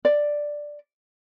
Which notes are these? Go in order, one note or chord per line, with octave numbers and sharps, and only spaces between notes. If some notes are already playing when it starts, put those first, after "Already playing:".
D5